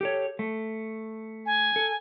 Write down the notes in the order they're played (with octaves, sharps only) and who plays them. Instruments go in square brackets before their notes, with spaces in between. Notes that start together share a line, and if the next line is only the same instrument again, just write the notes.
[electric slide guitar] G4 A4 C#5
A3
[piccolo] G#5
[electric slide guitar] A4